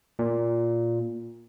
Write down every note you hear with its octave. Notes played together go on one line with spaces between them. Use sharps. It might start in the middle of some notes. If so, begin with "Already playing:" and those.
A#2